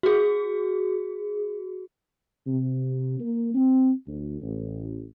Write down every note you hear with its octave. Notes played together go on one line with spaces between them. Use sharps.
F#4 G#4
C3
A#3
C4
D2
A1